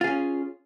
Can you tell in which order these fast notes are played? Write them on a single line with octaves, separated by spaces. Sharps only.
F4 G#4 C#4